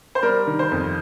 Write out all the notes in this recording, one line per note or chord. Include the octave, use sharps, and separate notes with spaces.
C5
G3 A#4
D#3
C5
F2